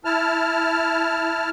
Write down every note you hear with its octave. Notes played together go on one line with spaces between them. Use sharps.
E4 A5 F6